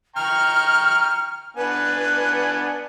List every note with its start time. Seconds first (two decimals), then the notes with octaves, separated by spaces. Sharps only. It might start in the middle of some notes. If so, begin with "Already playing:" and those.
0.16 G5 A#5 C#6 F6
1.56 B3 D4 B4 G#5